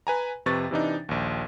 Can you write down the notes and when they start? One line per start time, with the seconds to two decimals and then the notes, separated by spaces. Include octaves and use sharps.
0.07 B4 G#5 A#5
0.46 F2 C3 B4 C#6 A6
0.71 C3 E3 D4 D#4
1.09 A#1 D#2